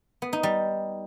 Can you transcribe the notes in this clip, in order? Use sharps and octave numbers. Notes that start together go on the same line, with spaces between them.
B3
D#4
G3